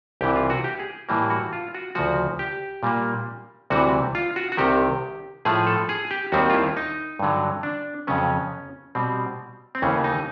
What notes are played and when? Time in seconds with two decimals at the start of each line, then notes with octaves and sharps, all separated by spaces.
0.21 C2 C3 E3 G4
0.36 F4
0.50 F#4
0.64 G4
0.79 G#4
1.09 A2 E3 G3 A#3
1.30 F#4
1.53 F4
1.75 F#4
1.95 D2 C#3 F3 F#4
2.39 G4
2.83 A#2 G3 A#3
3.70 D2 C3 E3 G3 F#4
4.15 F4
4.36 F#4
4.52 F#4
4.57 C2 C3 D#3 G4
5.45 A2 F3 A3 G#4
5.67 A4
5.89 G#4
6.11 G4
6.32 D#2 D#3 G3 C4 F#4
6.50 F4
6.54 E4
6.77 D#4
7.19 G2 D3 F#3
7.63 D4
8.07 F2 C#3 F#3 B3 C#4
8.95 B2 G3 C4
9.75 C4
9.82 D#2 C#3 E3 A3 C#4
10.04 D#4